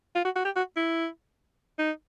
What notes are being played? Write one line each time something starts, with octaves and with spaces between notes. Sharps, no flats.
F4
F#4
F#4
G4
F#4
E4
D#4